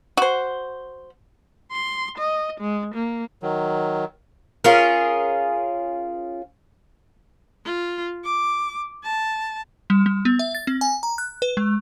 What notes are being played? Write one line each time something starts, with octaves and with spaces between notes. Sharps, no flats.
F#4 C5
C6
D#5
G#3
A#3
D#3 F#3
C#4 F4 G#4 A#4
F4
D6
A5
G3
G3
B3
E5
A6
C4
G#5
A#5
F#6
B4
G#3